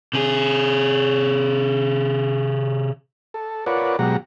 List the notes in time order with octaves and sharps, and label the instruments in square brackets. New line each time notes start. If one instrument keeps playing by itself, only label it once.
[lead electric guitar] C3 G#4
[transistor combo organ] A4
F4 A#4 B4 C#5 D5 F#5
B2 F#3 G#3 G4 F#5 A#5